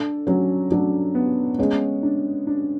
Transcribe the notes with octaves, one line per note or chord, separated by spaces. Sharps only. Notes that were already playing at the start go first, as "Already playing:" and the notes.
Already playing: D4 A4
F#3 C#4
F#3 D4
B3
G#3 C#4
D4
D4